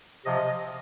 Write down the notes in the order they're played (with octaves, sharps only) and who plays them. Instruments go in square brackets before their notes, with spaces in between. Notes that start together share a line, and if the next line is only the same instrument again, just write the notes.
[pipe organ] C3 F3 D#5